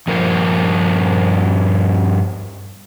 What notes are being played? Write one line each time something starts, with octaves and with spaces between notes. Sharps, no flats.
G2 F3 A#4 C5